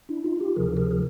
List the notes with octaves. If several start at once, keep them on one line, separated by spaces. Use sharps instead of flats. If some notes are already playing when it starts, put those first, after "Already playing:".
D4 E4
D#4 F4
F4 G4
D2 C3 F3 G#4 A#4
G#4 A#4
A#4